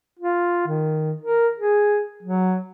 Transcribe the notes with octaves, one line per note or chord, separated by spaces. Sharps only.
F4
D#3
A#4
G#4
F#3